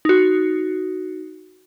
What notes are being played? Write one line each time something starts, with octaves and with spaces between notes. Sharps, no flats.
D#4 F#4